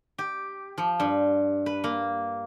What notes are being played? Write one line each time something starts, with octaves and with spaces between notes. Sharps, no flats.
G4
F3
G2
B4
A#3